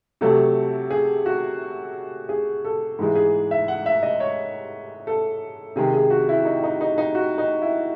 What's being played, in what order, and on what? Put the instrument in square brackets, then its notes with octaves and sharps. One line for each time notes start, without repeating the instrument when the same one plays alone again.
[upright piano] C3 F#3 A3 A4
G#4
F#4
G#4
A4
G#2 E3 G#3
G#4
E5
F#5
E5
D#5
C#5
A4
C3 D#3 G#3 G#4
G#4
F#4
E4
D#4
D#4
D#4
D#4
F#4
D#4
E4